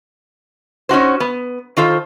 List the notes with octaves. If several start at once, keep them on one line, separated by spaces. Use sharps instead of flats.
C#4 D#4 F#4 C5
B3
D#3 F4 A4 C5